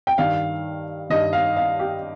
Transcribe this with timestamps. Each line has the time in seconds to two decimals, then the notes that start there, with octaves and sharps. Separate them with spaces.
0.07 G5
0.18 G2 D#3 F5
1.10 G2 D#3 D#5
1.33 F5
1.56 F5
1.79 G4